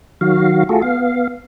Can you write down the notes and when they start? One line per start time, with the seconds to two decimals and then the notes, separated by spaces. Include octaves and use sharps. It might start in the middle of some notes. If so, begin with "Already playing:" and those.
0.21 D#3 F#3 F#4 F5
0.69 A3 F4 F#4 G#4 A4
0.82 B3 F5